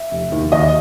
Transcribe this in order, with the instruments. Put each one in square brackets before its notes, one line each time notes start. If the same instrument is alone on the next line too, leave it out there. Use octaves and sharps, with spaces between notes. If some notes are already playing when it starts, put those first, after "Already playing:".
Already playing: [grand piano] E5
F1
D#2 D#3
D#2 D#5